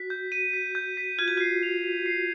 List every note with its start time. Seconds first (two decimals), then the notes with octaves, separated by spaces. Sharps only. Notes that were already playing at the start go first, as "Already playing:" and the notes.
Already playing: F#4 B6
0.10 G6
0.32 D#7
0.53 B6
0.75 G6
0.97 B6
1.19 F4 G#6
1.28 F#4
1.37 F4 C7
1.63 F7
1.84 F7
2.06 C7